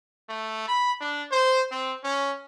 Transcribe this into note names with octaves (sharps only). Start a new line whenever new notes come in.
A3
B5
D4
C5
C4
C#4